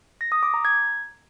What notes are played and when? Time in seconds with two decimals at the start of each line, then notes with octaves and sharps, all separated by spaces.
0.21 A#6
0.32 D#6
0.43 D6
0.54 A#5
0.65 G#6